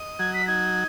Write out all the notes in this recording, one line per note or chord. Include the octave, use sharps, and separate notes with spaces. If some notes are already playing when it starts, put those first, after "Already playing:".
Already playing: D#5
F#3 G#6
B6
D#4 G#6